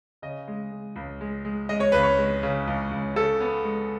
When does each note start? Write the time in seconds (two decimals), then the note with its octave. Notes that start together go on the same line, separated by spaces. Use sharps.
0.22 C#3 D#5
0.48 G#3
0.71 G#3
0.96 C#2
1.21 G#3
1.45 G#3
1.69 G#3 D#5
1.80 C#5
1.92 C#2 B4
2.03 C#5
2.18 G#3
2.43 C#3
2.67 C#2
2.91 C#2
3.16 C#3 A4
3.40 B3
3.64 G#3